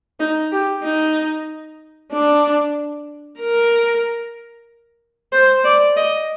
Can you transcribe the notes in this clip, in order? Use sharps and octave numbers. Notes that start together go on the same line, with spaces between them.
D#4
G4
D#4
D4
A#4
C5
D5
D#5